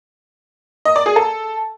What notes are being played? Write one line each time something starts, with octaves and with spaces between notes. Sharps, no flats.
D#5
D5
G#4
A4